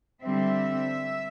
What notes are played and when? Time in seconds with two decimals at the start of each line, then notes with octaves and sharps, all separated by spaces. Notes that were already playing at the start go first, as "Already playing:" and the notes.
0.23 D3 G3 C4 E5